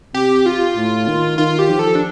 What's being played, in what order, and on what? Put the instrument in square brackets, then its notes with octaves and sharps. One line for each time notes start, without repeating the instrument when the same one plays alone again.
[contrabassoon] C3 [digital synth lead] G4
[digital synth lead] F4
[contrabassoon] A2
D#3
[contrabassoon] D#3 [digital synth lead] F4
[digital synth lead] G4
[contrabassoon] F3
[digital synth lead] A4
D4